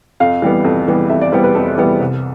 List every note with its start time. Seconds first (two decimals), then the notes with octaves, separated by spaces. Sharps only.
0.20 F2 F5
0.42 E3 G3 B3
0.64 F2
0.88 E3 G3 B3
1.10 F2 E5
1.21 D5
1.32 E3 G3 B3 C5
1.44 B4
1.55 F2 A4
1.78 E3 G3 B3
2.00 C2